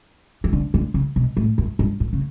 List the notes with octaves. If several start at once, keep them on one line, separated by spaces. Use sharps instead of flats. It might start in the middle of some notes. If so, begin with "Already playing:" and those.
E3
D3
D3
C#3
B2
A2
F#2
G2
A2
C#3